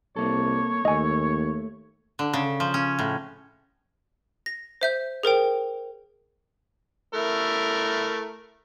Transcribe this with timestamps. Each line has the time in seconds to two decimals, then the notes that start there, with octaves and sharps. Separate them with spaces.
0.16 C2 A#3 A4 C#5
0.85 D#2 A3 D#5 G#5
2.19 D3
2.33 C#3
2.60 F3
2.74 C#4
2.99 A2
4.46 A#6
4.81 C5 E5 G6
5.23 G#4 A#4 C5 G5
7.14 A3 E4 A#4